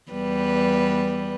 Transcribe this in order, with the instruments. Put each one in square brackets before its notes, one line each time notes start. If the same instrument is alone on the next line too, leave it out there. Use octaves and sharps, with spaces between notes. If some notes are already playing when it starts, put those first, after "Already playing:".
[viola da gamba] E2 G3 B4